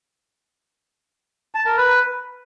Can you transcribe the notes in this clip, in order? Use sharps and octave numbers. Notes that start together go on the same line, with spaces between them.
A5
A#4
B4